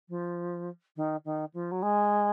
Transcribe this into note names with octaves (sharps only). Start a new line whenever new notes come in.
F3
D#3
D#3
F3
F#3
G#3